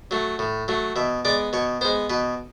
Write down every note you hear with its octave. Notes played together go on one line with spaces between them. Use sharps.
F#3 A3
A2
F#3 A3
B2 E5
G#3 B3 D5
B2 C#5
G#3 B3 C5
B2 B4